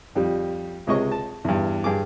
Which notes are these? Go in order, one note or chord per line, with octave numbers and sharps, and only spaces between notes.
F2 G3
C#2 C3 G#3 D#5 C#6
A5
E2 G2
G2 G#4 D6